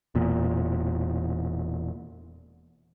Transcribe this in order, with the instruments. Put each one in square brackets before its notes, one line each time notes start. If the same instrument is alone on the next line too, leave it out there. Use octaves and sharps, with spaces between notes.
[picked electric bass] E1 E2 A#2